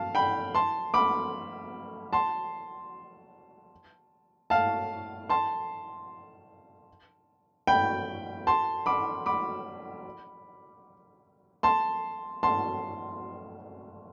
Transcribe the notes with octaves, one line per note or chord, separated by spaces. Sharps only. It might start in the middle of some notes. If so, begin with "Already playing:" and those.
Already playing: F5 A5
G5 B5
A5 C6
B5 D6
A5 C6
F5 A5
A5 C6
G5 B5
A5 C6
B5 D6
B5 D6
A5 C6
A5 C6